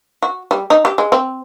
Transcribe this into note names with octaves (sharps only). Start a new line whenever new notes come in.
F#4
G3
D#4
G4
G#3
C4